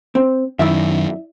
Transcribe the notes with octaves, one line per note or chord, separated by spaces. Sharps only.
C4
F#2 D#3 E4 D5 E5